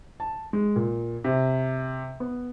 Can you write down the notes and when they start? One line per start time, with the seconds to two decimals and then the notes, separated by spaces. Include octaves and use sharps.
0.20 A5
0.53 G#3
0.76 A#2
1.24 C3
2.20 B3